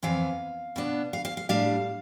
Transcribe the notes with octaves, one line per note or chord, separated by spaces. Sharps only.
F2 E3 B3 F5
B2 B3 D4
F5
F5
F5
A2 G3 D4 F5